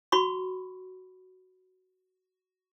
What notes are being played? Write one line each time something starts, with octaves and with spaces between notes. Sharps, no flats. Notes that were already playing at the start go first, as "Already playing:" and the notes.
F#4 B5 C#6